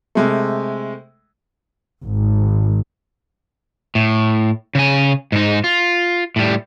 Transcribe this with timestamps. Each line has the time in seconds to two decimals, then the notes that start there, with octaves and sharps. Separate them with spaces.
0.15 C3 G#3 A3
2.04 G#1
3.95 A2
4.75 C#3 G#5
5.32 G#2 D#4
5.64 F4
6.36 A2 G3